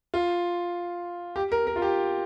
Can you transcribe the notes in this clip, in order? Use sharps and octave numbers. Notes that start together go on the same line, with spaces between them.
F4
G4
A#4
A#4
F4
G4